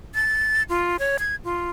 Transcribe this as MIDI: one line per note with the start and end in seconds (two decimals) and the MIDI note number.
0.15 0.63 93
0.69 0.97 65
0.99 1.17 73
1.19 1.35 92
1.44 1.71 65